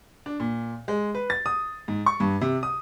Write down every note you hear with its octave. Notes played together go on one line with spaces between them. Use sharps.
D4
A#2
G#3
B4
A6
D#6
G#2
C#6
G2
C3
D#6